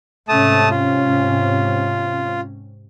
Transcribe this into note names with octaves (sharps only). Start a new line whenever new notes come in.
G#2 C3 A3 C#4 A5 D#6
F4